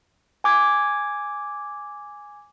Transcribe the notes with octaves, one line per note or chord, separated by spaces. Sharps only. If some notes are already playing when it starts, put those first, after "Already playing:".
G#5 D6 G#6